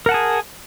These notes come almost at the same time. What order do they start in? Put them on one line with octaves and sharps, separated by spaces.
A#4 F#5 A5 G#4